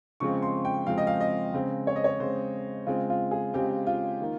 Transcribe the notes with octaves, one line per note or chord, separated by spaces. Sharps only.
C#3 F3 G#3 C4 C#6
C6
G5
C#3 F3 G#3 C4 F5
D#5
F5
D#5
C#3 G#3 C4
C#5
D#5
C#5
C#3 G#3 C4 C5
C#3 G#3 C4 F4
F4
G#4
C#3 G#3 C4 G4
F4
D#3 A#3